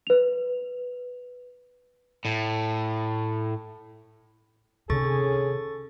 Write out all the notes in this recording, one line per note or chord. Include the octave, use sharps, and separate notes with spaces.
B4 F7
A2
C3 D#3 C#4 G#4 A4 C#6 A6